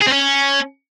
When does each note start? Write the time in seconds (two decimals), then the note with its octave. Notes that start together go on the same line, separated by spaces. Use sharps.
0.02 G#4
0.07 C4
0.13 C#4